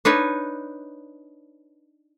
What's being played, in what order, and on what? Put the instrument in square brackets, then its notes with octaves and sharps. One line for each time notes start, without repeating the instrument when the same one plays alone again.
[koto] D4 D#4 B4 C#5